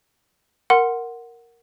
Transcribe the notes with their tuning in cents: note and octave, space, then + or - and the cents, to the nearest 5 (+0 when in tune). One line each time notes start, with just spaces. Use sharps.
A#4 +0 F#5 +0 C6 +0